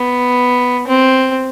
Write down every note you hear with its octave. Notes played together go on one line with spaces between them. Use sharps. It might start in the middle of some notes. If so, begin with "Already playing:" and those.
Already playing: B3
C4